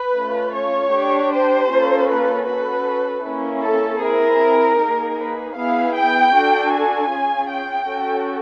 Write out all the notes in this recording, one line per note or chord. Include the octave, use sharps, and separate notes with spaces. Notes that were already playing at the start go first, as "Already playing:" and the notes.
Already playing: B4
A3 C#4 F4
C#5
D4 G4
C5
A#3 C#4 F4 A4
B4
C#4 F#4 A4 B4
A#3 C#4 E4
A4
C4 E4 G#4 A#4
A#3 D#4 G#4
B4
B3 E4 G#4 F5
G5
D4 F#4 A4
G#5
C#4 F4 G#4
G5
C#4 F#4 A4